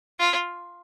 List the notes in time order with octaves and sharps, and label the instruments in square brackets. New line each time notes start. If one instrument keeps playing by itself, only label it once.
[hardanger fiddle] F4